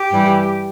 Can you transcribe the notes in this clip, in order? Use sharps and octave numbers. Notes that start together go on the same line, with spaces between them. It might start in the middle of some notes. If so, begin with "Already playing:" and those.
Already playing: G4
G2 E3 G3